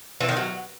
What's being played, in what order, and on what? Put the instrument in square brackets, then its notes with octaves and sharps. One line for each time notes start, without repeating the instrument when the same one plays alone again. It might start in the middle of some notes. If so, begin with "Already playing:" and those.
[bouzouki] E3
D#3
F#3